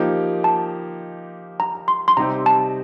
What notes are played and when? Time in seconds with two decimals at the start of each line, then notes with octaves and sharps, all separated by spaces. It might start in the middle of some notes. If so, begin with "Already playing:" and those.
Already playing: F3 A#3 D#4 G4
0.44 A5
1.60 A#5
1.88 C6
2.08 C6
2.17 C3 G3 C4 D#4 G4 A#5
2.46 A5